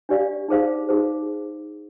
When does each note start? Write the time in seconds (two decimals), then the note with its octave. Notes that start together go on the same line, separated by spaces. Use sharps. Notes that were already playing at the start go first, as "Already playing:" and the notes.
0.09 D4 G4 D5 F5
0.48 D#4 G#4 C5 F5
0.88 D#4 G#4 C5